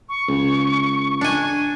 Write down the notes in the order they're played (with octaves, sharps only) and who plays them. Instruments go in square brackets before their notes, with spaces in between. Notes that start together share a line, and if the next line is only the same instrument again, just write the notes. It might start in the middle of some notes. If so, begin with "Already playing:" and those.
[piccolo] C#6
[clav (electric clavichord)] C#2
[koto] D4 G#5